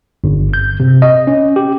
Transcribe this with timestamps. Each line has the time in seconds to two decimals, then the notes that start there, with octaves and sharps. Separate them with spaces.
0.24 G1
0.54 G6
0.80 C3
1.02 D#5
1.27 C#4
1.56 G4